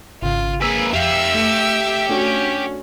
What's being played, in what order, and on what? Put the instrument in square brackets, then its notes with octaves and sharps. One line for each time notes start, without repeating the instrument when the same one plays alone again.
[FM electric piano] G#1 C#3 [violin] F4
[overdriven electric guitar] A#3 B4 [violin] G#4 [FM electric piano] E6
[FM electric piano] F2 [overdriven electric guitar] G4 F5 [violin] E5 E6
[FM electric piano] A3 C#7
[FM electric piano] A3 D4 F#4 [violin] C#4